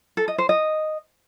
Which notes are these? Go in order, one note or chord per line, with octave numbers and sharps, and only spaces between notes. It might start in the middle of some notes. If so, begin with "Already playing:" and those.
A4
D#5
C5
D#5